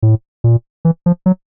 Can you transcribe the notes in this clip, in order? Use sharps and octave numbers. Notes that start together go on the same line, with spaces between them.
A2
A#2
E3
F3
F#3